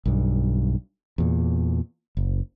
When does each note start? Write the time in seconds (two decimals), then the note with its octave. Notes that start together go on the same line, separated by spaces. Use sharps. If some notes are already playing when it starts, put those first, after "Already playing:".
0.06 B1 G2
1.18 E2 A#2
2.17 F#1